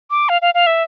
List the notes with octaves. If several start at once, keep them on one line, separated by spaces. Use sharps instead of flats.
D6
F5
F5
F5
E5